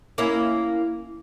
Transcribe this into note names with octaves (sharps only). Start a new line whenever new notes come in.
A#3 C#4 E4